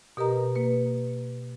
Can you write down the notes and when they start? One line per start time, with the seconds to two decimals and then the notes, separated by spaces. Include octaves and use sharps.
0.17 B2 G4 A#4 B4 D#5 A#5
0.55 A#3 B4